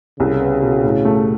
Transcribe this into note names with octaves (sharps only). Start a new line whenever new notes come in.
C2 C#3
B3
B2
A2
A3